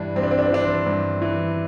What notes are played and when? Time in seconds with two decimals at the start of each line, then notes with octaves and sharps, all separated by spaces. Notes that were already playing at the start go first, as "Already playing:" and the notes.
Already playing: G2 E3 D4
0.16 G2 C4
0.23 D4
0.31 C4
0.39 D4
0.46 C4
0.51 E3 D4
0.61 C4
0.86 G2
1.22 E3